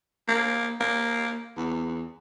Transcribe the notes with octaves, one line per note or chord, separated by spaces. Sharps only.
A#3
A#3
E2